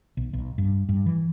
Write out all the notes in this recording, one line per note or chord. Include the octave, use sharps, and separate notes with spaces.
B1
B1
G2
G2
E3